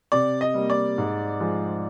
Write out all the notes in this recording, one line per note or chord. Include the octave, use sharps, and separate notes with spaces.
C3 D5
D#5
G3 A#3
D5
G#2
F3 G#3